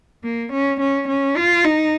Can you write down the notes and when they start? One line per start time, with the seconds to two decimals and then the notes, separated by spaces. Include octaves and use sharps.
0.24 A#3
0.52 C#4
0.80 C#4
1.08 C#4
1.37 F4
1.64 D#4